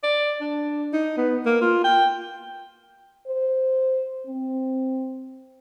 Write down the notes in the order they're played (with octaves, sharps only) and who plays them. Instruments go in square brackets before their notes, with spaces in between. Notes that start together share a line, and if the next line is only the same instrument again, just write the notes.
[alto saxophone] D5
D4
D#4
B3
A#3
F4
G5
[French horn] C5
C4